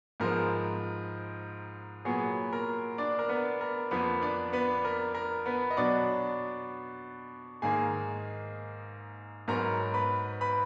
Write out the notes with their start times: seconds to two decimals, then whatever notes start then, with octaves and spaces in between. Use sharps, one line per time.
0.20 G#2 F3 G#3 B3 A#4
2.05 A#2 F#3 B3 G#4
2.53 A#4
2.98 D4 D5
3.19 A#4
3.29 B3 B4
3.61 A#4
3.91 F2 F3 A#3 B3 B4
4.22 D4 D5
4.53 B3 B4
4.85 A#4
5.15 A#4
5.46 B3 B4
5.70 D#5
5.76 B2 F#3 B3 D4 D5
7.62 G#2 D#3 A#3 G#4 G#5
9.48 G#2 F#3 B3 A#4 A#5
9.94 B4 B5
10.41 B4 B5